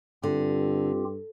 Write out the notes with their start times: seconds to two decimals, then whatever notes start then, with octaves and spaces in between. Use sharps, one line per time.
0.24 G2 D3 C4 F4 G4